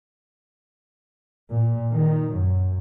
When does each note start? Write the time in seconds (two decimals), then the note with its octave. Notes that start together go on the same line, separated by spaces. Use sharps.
1.50 A#2
1.91 D#3
2.33 F#2